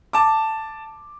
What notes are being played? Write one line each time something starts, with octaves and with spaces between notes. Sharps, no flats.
A5 D6